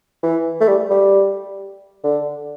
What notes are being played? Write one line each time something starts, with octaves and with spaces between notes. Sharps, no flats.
E3
A3
G3
G3
D3